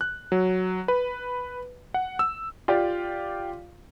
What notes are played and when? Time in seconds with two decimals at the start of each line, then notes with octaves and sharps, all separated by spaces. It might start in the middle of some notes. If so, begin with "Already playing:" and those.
0.01 F#6
0.32 F#3
0.88 B4
1.94 F#5
2.19 E6
2.68 F4 G4 D5 F5